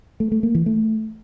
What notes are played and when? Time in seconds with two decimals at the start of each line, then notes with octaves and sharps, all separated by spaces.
0.20 A3
0.32 A3
0.43 A#3
0.55 E3
0.66 A3